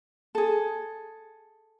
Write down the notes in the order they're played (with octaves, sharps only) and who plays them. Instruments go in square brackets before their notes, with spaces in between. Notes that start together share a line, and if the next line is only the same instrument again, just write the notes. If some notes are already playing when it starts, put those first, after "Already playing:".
[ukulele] G#4 A4